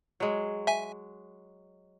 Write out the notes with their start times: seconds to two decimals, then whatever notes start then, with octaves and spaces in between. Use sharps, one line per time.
0.20 F#3 G#3
0.67 E5 G#5